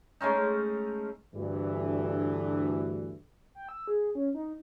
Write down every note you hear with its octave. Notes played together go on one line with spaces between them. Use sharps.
G#3 A3 C#4 D#4
D2 G2 E3
G5
E6
G#4
C#4
D#4